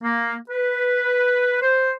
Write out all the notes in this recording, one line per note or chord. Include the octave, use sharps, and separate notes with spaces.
A#3
B4
C5